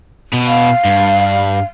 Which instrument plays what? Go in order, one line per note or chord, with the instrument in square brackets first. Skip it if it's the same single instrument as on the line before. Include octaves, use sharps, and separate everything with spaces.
[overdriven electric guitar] B2
[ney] F5
[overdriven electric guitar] G2